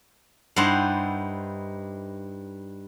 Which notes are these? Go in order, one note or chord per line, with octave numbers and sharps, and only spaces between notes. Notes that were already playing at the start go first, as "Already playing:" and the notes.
G2 D#4 E4 C5 F#5